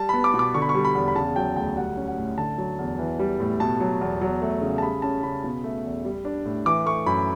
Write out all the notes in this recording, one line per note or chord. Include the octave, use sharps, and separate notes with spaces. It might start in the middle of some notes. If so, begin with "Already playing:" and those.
Already playing: G3 A5
B3 B5
D6
B2
D6
D3 C#6
B5
C#6
G3
B5
E2
B5
C#3 A5
F#3 G5
D2 G5
G3 F#5
C#4
F#5
A2
D3 A5
F#3
E2
E3
G3
A2
B2 A5
F#3
E2
F#3
A3
C#3
A5
G3 B5
C#4 A5
C#3 B5
B2
A3
E2
G3
D4
A2
E3 D6
A3 C#6
F#2 B5